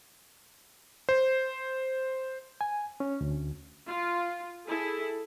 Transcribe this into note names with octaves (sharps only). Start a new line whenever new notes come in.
C5
G#5
C#4
D2
F4
E4 G#4 A4